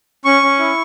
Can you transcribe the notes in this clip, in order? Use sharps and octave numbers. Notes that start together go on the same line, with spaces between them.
C#4 C#6
C#4
E4